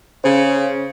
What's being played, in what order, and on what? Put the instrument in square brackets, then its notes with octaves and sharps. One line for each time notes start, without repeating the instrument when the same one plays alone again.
[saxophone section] C#3 [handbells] C5